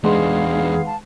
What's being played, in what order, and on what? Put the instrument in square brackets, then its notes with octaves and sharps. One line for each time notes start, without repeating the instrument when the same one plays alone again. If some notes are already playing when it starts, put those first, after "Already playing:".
[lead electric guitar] E2 D4 [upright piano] G#3 C6 [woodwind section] B3 D#4 F5 [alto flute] G#4
[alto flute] A5